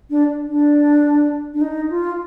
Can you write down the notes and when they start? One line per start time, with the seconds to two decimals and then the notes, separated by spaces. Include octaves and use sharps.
0.10 D4
0.48 D4
1.54 D4
1.61 D#4
1.90 F4